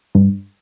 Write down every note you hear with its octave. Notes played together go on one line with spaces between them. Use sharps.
G2